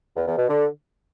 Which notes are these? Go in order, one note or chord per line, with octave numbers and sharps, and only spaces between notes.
E2
E2
B2
D3